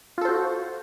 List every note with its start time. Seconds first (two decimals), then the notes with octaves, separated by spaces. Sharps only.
0.18 F4
0.21 A4
0.25 C5
0.29 F#4